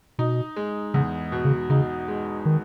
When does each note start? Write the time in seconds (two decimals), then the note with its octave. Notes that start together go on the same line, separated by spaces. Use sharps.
0.19 B2 D#4
0.56 G#3
0.94 E2 C#3
1.32 B2
1.45 C#3
1.70 C#3 D#4
2.08 G#3
2.45 D#3